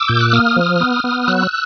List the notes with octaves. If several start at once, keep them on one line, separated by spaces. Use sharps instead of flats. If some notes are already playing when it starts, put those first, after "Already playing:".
Already playing: D6 E6
A#2 G6
F#6
A#3 D#6 F6
F3
B3
B3
F#3 E6 F#6